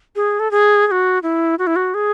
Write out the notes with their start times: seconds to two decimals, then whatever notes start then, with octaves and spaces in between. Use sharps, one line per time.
0.16 G#4
0.40 A4
0.51 G#4
0.87 G#4
0.91 F#4
1.23 E4
1.59 F#4
1.67 E4
1.76 F#4
1.94 G#4